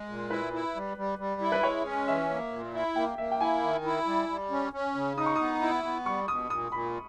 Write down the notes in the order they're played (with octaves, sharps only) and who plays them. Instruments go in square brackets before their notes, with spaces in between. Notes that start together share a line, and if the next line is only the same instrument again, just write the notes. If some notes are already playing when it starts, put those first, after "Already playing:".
Already playing: [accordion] G#3
A#2
[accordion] E4 [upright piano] B4
[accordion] E4
G3
G3
G3
E4
[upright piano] B4
[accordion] G#3 [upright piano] C#5
[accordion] C#4
[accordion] E3 [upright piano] E5
[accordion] A#3
A#2
E4
[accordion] A#3 [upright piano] G5
[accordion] A#3 [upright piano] E5
[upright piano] G5
[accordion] E4 [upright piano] G#5
[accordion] D#3
E4
G3
G3
C#4
C#4
C#3
[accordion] D#4 [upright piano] D#6
[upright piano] C#6
[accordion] B3 [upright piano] D#6
[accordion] E4
B3
[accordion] G3 [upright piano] C#6
[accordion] B2 [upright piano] D#6
[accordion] A#2 [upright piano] D#6
[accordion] A#2 [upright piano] B5